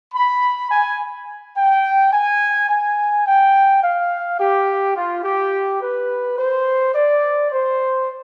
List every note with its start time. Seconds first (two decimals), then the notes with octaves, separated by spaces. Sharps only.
0.15 B5
0.71 G#5
1.57 G5
2.13 G#5
2.69 G#5
3.26 G5
3.83 F5
4.40 G4
4.97 F4
5.24 G4
5.82 B4
6.39 C5
6.95 D5
7.51 C5